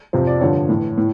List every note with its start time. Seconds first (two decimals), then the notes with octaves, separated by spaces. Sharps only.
0.13 F2 C3 F3 C5
0.27 D5
0.41 G2 D3 F3 C#5
0.69 A2 E3
0.98 A2